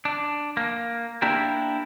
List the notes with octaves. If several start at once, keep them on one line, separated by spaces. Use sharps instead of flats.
D4
A#3
A#3 D4 E4 G4 A#4